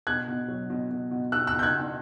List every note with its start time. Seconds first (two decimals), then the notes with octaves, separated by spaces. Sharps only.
0.07 B2 F#6 G#6
0.28 B2
0.48 F#3
0.70 B2
0.90 B2
1.11 B2
1.32 B2 E6 F#6
1.47 B2 E6 F#6
1.59 G6
1.63 F#6 G#6
1.73 B2